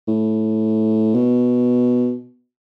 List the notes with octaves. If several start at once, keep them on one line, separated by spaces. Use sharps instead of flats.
A2
B2